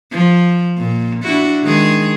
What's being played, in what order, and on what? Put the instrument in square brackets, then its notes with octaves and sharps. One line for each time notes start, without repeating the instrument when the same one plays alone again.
[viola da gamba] F3
A#2
D4 E4 F#4
D#3 G#3 G#4